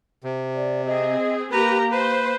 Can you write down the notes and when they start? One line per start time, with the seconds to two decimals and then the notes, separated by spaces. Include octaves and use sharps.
0.24 C3
0.55 D5
0.86 C4 G#4 D#5
1.51 A#3 G4 A#4 B4 A#5
1.92 B4 C5